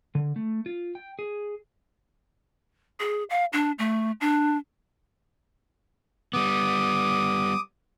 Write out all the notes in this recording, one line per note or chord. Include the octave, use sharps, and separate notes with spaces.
D3
A3
F4
G5
G#4
G#4
F5
D4
A3
D4
G3 B3 D6 D#6